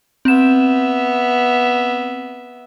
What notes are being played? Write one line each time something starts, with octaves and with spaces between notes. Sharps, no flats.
B3 C4 E5 E7